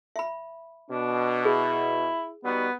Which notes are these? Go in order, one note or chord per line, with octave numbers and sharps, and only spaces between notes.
E5 B5
B2 D4
E4 G#4
G3 B3 D#4 F#4